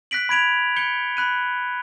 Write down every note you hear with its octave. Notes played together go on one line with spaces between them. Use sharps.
F#6 A#6 B6 D7 F#7
B5 G#6 D7 F7
G6 C#7 D7 G7
B5 F#6 D#7